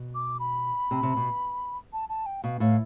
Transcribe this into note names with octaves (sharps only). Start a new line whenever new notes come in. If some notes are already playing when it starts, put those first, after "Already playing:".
Already playing: B2
D6
B5
C3
C3
B2
A5
A5
G5
B2 F5
A2 F5